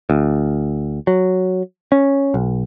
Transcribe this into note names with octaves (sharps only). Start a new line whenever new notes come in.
D2
F#3
C#4
B1